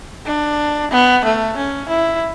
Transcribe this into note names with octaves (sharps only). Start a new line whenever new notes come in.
D4
B3
A3
C#4
E4